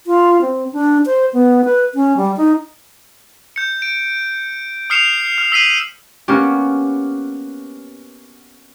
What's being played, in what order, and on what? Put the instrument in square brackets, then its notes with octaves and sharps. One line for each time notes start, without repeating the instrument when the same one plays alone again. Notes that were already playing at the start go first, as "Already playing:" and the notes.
[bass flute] F4
C4
D4
C5
B3
B4
C#4
G3
D#4
[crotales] G6 C#7
D7
D#6 F6 C7 C#7 E7 F7
F6
E6 B6 C7 D#7 F#7
[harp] A#3 B3 C#4 G4